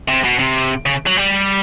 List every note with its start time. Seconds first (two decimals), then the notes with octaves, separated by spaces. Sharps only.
0.09 C3
0.25 B2
0.40 C3
0.86 C#3
1.06 F#3
1.17 G3